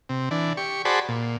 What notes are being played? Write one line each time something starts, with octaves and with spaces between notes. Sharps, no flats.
C3
E3 D4
G4 C#6
F#4 G#4 C5 D5 A5 B5
A#2